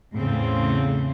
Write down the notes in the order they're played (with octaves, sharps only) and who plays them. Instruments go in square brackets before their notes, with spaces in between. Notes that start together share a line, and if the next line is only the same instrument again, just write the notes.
[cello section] E2 A2 C#3 C4